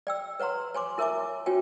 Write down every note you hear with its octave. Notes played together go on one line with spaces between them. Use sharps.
D5 G5 E6
B4 C#5 F#5 A#5 C6
C#5 G#5 C6 D6
E4 A#4 C#5 E5 G#5 D6
C#4 F4 F#4 C#5 G5 G#5